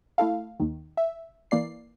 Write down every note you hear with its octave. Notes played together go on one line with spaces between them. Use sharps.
A3 E4 A4 F5
D#2 D#3
E5
E3 A#3 D5 C7